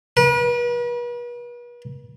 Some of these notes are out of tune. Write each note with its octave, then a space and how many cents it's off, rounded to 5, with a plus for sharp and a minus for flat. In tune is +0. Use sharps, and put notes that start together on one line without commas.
B4 -40